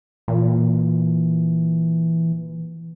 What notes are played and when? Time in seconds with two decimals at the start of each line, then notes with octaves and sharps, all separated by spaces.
0.28 A#2 E3